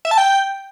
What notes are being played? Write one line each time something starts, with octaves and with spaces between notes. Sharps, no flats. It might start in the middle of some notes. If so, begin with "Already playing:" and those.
E5
A5
G5